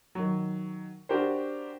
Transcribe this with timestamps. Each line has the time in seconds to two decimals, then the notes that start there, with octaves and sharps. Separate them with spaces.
0.15 D#3 F#3
1.09 D4 F#4 G4 A#4 C5